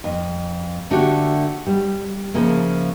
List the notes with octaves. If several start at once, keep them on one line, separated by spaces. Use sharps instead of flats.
F2
D3 A3 D4 F#4 G4
G3
C#3 F3 A3 A#3